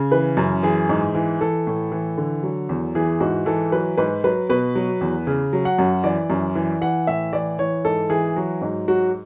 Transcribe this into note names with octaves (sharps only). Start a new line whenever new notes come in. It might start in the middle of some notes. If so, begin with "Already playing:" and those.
Already playing: C#3
E3 B4
F#2
E3 G#4
G#2
E3
E3 A4
A2
E3
D3
F#3
E2
E3 G#4
G#2 F#4
E3 A4
F#3 B4
G#2 B4
F#3 B4
B2 B4
F#3
E2
C#3
F#3
F#5
F#2
E3 D5
F#2
E3
E3 F#5
A2 E5
E3 D5
E3 C#5
G#2 A4
E3 G#4
F#3 F#4
G#2
F#3 F#4